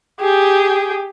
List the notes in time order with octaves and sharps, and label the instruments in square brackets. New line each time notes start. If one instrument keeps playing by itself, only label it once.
[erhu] G4 [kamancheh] G#4 G5